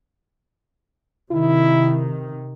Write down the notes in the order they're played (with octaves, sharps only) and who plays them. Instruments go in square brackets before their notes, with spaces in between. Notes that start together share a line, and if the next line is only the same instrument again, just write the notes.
[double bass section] C3 D#3 [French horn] E4